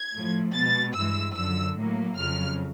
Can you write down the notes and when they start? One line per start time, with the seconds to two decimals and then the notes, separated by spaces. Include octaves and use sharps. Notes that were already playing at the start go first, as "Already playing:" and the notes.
Already playing: G#6
0.13 A2 F3 A3
0.53 B2 G#3 A6
0.94 G2 E3 G#3 E6
1.35 F#2 D3 F3 E6
1.76 A2 F#3 A#3
2.17 F2 C#3 F#3 F6